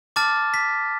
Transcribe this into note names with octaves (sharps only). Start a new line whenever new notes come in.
A5 D6 F6 A6
B6